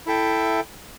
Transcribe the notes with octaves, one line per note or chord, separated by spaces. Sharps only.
E4 A4 E5 G5